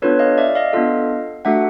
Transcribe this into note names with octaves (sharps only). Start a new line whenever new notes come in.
B3 D4 F4 A4 B4 C#5
D#5 F5
D5 E5
D#5 F5
B3 D4 F4 A4
A3 D4 F#4 A4 E5 F#5